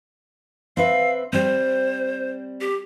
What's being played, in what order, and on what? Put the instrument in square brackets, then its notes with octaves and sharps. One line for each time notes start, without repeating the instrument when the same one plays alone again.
[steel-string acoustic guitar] C4 B4 E5 [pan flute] F5
[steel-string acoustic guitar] G3 C4 [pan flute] C5
[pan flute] G4